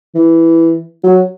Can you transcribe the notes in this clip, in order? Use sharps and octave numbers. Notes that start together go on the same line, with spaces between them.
E3
F#3